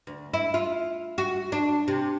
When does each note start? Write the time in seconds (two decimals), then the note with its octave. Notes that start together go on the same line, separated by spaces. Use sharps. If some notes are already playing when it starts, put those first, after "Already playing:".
0.07 D2
0.34 E4
0.54 F4
1.18 F#4
1.52 D4
1.88 C3